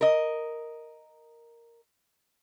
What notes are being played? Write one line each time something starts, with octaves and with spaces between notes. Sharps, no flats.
A#4 D#5